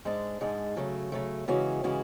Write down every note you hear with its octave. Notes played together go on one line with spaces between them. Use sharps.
G#2 G#3 D4
G#2 G#3 D4
C#3 F#3 A3
C#3 F#3 A3
C#3 E3 G#3 C#4 F#4
C#3 E3 G#3 C#4 F#4